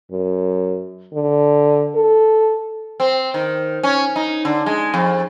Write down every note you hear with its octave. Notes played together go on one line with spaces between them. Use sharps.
F#2
D3
A4
C4
D#3
C#4
D#4
D3
G#3
F2